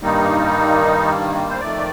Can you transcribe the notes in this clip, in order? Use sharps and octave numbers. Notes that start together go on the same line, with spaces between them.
G2 D#3 G3 A#3 D#4
C5
F2 D#3 A3 D5